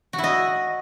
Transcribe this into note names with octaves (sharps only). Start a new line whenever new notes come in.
F#4
E4
D#5